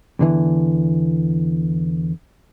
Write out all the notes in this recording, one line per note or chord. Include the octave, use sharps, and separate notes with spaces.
E2 D3 E3